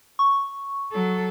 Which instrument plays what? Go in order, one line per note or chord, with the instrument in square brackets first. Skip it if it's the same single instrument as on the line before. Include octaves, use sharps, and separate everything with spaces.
[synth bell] C#6
[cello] F#3 A4